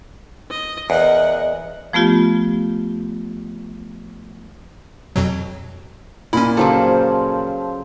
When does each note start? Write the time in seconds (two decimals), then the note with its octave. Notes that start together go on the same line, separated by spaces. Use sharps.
0.50 D#5
0.90 E2 A#4 D#5 F#5
1.93 F3 A3 B3 F4 G4
5.16 F2 B2 F#3
6.33 A#2 C#4 E4 B5
6.57 C#3 F3 F#3 G4 A4 C5